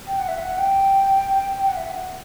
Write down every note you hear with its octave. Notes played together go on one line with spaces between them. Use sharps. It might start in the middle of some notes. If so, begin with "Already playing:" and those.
G5
F#5
E5
F#5
G5
G5
F#5
E5
F#5